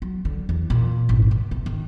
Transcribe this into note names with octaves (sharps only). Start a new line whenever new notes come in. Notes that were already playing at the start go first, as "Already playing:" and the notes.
F#3
D3
E2
A#2
G#1
C#2
C3
D#3